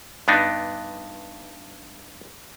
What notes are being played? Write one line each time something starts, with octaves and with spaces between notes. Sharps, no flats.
G2 B3 D4 D#4